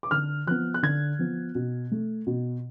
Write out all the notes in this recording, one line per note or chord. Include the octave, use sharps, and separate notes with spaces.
D6
D3 F6
F3 B3 F#6
F#6
D3 G#6
F3 B3
B2
A3
B2